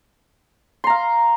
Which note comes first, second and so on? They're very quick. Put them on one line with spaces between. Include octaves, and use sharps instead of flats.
C6 A#5 F5